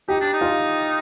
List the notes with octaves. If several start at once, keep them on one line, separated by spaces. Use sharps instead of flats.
D#4 G4
D4
D#4
F4